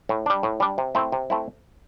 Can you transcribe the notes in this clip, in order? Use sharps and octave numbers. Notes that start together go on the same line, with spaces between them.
A2
G3 D4
A2
G3 D4
C3
A3 C4 E4
C3
A3 C4 E4